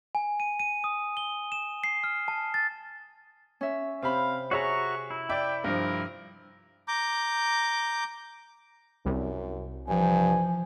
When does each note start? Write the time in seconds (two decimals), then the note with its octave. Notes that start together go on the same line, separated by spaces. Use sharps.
0.15 G#5
0.40 D#7
0.60 D#7
0.84 D#6
1.17 G7
1.52 E7
1.84 C7
2.04 F6
2.28 A5
2.54 A6
3.61 C#4 E5
4.03 C3 C4 C5 F5 B5
4.51 F#4 G#4 C#5 E5 A#5 C#6
5.10 E4
5.29 D5 E5 G5 D6
5.64 G2 F3 A#4
6.88 A#5 D6 G6
9.05 C2 F#2
9.88 G2 E3 F3 G#5